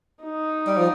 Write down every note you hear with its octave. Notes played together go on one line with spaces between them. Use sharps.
D#4
G3
F3